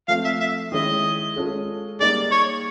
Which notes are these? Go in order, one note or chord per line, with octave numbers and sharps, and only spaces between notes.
F3 A3 C4 F5
E5
E5
D#3 G#3 C#4 E4 D#5
G#3 C#4 F4 A4
G3 A#3 D#4 G#4 D5
C#5